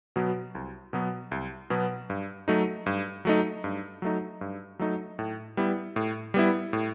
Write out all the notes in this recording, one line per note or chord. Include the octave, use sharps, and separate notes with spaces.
B2 F#3 B3
C2
B2 F#3 B3
C2
B2 F#3 B3
G2
F#3 A3 D#4
G2
F#3 A3 D#4
G2
F#3 A3 D#4
G2
F#3 A3 D#4
A2
G3 B3 E4
A2
G3 B3 E4
A2